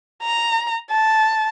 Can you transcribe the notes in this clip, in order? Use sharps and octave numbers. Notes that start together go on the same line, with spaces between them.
A#5
A5